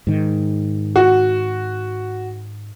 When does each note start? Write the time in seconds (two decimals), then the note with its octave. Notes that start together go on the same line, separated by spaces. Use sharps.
0.07 G#2 D#3
0.96 F#4